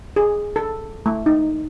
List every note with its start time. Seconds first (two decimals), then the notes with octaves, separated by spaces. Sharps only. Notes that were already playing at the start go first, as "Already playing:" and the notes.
0.16 G#4
0.56 A4
1.06 A3
1.26 D#4